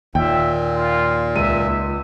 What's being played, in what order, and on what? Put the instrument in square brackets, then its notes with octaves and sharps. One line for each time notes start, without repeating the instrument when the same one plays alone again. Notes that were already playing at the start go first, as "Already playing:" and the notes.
[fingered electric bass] D#2 [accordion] A#2 [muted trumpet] E5 [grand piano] G5
[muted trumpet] F4
[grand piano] C#2 D#7 [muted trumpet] E5